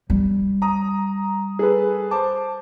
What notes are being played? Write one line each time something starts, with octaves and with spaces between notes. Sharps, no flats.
G3
A#5 D#6
G#4 A4 B4
C5 A5 D6